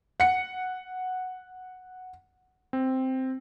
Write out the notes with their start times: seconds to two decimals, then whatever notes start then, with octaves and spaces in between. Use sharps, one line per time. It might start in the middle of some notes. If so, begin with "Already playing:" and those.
0.20 F#5 C#7
2.73 C4